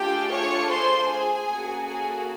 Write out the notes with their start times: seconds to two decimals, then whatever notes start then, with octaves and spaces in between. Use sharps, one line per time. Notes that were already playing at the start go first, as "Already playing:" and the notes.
Already playing: A3 D4 F4 G4 G#4 G5
0.31 C#5 C#6
0.69 C5 C6
1.07 G#4 G#5
1.47 A#3 C#4 F#4 A4
1.85 G#4 G#5